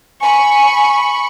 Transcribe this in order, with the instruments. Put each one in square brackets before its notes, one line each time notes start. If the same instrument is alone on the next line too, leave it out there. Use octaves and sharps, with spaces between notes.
[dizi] G#5 [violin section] B5 C#6